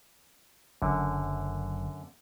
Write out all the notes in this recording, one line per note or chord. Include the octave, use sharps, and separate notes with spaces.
F#1 F#2 D3